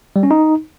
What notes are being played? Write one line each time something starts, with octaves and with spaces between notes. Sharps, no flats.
G3
C#4
D#4